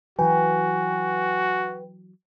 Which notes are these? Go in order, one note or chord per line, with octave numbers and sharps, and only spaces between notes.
E3 F#3 F#4 B4 G5 G#5